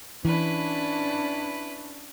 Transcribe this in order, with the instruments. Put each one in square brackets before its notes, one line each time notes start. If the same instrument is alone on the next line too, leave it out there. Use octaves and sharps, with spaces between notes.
[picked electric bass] E3 [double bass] C#4 D4 [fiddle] E4 B4